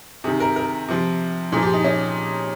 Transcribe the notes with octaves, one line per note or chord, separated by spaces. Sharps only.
C3 D#3 G#4
A#4
A#4
C3 F3
A#2 F3 G#4
G4
D#4
C#4